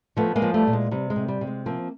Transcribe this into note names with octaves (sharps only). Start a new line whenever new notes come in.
F3 A3 B3
G#3 A#3
F3
G3 A3
A#2
G#3
C3 G3
G#3
C3
G3
C3
G#3
F3 A#3 C4